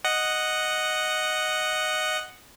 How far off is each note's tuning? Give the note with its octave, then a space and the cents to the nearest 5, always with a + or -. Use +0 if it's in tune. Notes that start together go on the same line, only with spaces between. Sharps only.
D#5 -5 F#5 +0